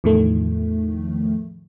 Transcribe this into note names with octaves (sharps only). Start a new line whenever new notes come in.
E2 A2 D#3 F3 A3